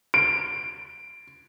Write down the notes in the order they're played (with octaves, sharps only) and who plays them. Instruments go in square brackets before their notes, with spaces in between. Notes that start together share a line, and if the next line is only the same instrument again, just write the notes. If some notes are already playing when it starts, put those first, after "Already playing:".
[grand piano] D7